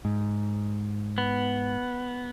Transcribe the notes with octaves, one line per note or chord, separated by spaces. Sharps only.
G#2
B3